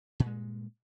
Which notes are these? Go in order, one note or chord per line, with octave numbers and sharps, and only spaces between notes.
G2 A#2 G#3